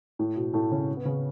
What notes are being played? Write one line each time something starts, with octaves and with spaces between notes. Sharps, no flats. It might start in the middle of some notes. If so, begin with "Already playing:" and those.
A2
B2
A2 A3
C#3 C#4
B3
C#3 C#4